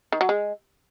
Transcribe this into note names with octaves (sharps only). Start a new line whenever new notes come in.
D#3
F#3
G#3